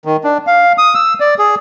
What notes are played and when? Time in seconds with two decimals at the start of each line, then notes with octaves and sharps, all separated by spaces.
0.05 D#3
0.24 D4
0.47 F5
0.78 D#6
0.95 E6
1.20 D5
1.39 G#4